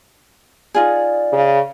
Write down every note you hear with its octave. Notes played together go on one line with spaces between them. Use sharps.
D#4 F4 G#4 D5
C#3